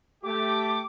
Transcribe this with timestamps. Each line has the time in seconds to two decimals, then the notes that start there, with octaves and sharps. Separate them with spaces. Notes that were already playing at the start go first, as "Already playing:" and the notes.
0.23 A3 G4 D6